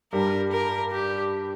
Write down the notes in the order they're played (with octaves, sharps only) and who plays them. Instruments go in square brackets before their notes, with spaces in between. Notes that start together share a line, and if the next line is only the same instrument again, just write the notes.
[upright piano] G2 G3 [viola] A#4
[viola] A#4
G4